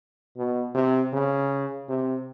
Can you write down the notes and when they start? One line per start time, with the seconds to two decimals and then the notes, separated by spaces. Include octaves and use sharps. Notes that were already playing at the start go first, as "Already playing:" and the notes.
0.37 B2
0.74 C3
1.13 C#3
1.89 C3